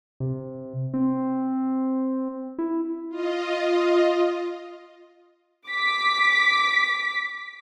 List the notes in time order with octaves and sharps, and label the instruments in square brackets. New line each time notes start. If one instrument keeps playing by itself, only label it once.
[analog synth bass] C3
C4
E4
[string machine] F4 D#5
[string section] D6 B6